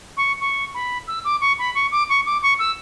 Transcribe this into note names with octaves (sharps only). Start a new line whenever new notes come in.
C#6
C#6
B5
E6
D6
C#6
B5
C#6
D6
C#6
D6
C#6
E6